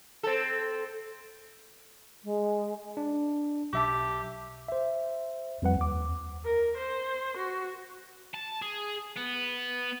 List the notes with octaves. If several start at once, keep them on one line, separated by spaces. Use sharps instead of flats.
C4 A4
G#3
D4
B1 G4 E5 A5
C5 E5
F2 G3 B4 F#5
D#2 D6
A#4
C5
F#4
A5
G#4
B3